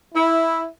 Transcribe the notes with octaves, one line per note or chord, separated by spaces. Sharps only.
E4